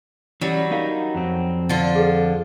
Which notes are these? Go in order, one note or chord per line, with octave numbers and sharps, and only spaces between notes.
E3 F#3 G3 C#4
C#4 D#4 E4 A#4 F5
F2 C4
D3 F4
G#4 A4 B4